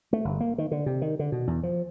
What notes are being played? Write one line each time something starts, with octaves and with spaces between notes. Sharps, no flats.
A3
G1
A#3
D#3
D3
C3
D#3
D3
B2
E2
F3